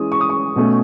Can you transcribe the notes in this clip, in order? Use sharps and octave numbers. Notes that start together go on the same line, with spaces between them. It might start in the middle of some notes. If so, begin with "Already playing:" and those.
Already playing: E3 G#3 C#4 D#6
C#6
D#6
C#6
B2 A3 C#4